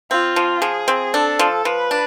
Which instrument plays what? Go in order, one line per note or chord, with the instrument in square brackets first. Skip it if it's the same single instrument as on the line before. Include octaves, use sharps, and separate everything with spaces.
[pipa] C4 [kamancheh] F4
[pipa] F3
[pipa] F3 [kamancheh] G#4
[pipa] C4
[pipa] D4 [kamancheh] A4
[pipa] F3
[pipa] F3 [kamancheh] B4
[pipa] D4